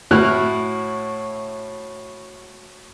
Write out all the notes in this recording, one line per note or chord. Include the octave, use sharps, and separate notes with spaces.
A2 E4 F#4 F6 F#6